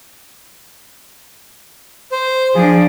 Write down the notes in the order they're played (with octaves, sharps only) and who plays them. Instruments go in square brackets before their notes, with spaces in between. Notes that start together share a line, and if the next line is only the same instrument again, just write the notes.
[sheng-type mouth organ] C5
[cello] F3 D4 [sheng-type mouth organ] G#4